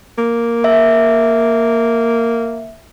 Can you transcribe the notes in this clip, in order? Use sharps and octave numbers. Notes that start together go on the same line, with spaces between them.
A#3
E5